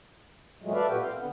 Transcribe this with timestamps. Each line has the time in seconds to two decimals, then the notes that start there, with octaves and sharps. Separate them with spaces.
0.62 E2 A#2 F#3 G#3 A3
0.73 A4 B4 D5 E5 F5
0.88 A#2 F#4 G4 B4 G5
1.01 C4 F5 G5
1.16 D3 B3